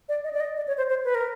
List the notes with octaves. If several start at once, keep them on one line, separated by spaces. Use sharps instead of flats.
D5
D#5
D5
D#5
D5
C#5
C5
C5
B4
A#4